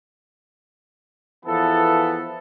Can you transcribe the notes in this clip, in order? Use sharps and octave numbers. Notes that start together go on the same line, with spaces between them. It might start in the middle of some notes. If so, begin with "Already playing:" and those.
E2 E3 F3 B3 A4